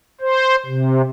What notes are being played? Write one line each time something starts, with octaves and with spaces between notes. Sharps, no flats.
C5
C3